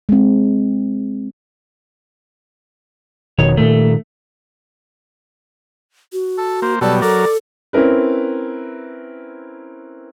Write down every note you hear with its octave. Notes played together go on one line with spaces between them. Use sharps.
G#3 C4
F1 B2 D#3 C#5
A#2 D#3 A3
F#4
A4
A#3 C5
B2 F#3 G3 A4 D5
F#3 A4 A#4 D5
C4 C#4 E4 A#4 B4